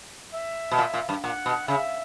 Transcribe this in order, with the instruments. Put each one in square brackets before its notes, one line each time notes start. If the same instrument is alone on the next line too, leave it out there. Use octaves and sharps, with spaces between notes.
[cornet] E5
[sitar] B2
A#2
A#2
G2
[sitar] A#2 [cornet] F#5
[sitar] B2
[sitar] C#3 [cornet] E5